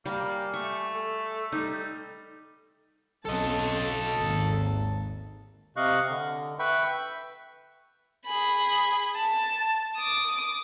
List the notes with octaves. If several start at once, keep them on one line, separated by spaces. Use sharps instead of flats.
G3 A#3
G#5
A3 C#6
A4
G3 D#4
B1 C#4 A4 D#5 A5
G#1 D#2
C3 D#5 F5 C#6 F#6
D3
B4 E5 G5 B5 C#6
G#4 B5
A5
D6 D#6